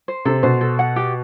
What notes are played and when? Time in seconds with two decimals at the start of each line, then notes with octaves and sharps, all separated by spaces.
0.08 C5
0.25 C3 A4
0.43 B2 C5
0.61 A4
0.79 F#5
0.96 G4